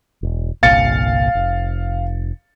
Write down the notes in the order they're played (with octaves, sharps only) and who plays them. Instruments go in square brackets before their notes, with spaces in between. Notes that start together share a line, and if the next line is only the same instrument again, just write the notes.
[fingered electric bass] E1
[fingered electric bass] G1 C2 A#2 [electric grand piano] F5 A6 C#7
[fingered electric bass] F1